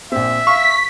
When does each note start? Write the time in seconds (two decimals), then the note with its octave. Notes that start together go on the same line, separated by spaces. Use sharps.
0.12 A#1 C4 E5
0.47 F5 C#6 B6